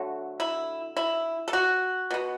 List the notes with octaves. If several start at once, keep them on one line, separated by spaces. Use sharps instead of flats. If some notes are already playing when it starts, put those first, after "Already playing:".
Already playing: D3 F#3 A3
E4
E4
A4
F#4
B2 B3